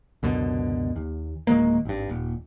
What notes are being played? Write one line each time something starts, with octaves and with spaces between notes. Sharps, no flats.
C#2 F#2 B2 D3
D#2
D1 D#3 G#3 A#3
G#1 G2
D#1